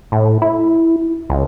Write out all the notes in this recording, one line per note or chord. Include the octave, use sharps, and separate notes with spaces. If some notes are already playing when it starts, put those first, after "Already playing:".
A2
E4
C#2